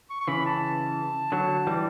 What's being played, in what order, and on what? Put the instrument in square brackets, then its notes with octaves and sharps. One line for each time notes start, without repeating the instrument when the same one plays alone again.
[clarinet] C#6
C#6
[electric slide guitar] C#3 E3 [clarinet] B5
[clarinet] A5
[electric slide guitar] D3 F#3
E3 G3